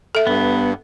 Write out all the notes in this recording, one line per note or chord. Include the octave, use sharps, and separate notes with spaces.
A4 E5
G2 B3